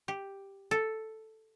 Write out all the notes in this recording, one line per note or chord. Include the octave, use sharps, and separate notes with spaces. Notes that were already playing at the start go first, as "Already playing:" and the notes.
G4
A4